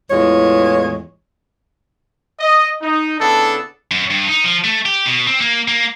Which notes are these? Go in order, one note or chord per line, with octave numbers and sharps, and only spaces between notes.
E2 A2 E3 G#3 F4 C#5
D#5
D#4
C#3 B3 D4 E4 A4
F#2
G2
D#4
F3
A3
G4
B2
C4
A#3
A#3